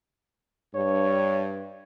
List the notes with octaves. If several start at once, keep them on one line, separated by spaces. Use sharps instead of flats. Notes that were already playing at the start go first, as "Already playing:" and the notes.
G2 C#5